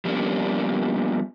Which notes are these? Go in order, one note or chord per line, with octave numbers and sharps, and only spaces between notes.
F3 G3 A#3 B3 C#4 D4